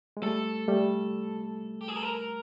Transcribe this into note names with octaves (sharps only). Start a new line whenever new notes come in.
G#3
G3 A3 A4
G3 A3
G4
G#4
A4
A#4